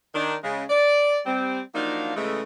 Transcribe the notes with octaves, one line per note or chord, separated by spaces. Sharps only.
D#3 D4
C#3 G#3
D5
G3 C4
F3 F#3 A#3 D4 D#4 F5
C#3 E3 G#3 A3